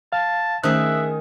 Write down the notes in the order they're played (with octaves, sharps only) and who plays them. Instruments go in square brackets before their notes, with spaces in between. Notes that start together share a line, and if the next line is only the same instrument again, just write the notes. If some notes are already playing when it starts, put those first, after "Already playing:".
[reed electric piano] F5 [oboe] A5
[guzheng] D#3 G#4 [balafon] A3 C#4 C5 [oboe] E5 [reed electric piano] F#6